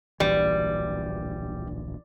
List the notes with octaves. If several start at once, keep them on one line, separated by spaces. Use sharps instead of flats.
D1 A#1 E3 G3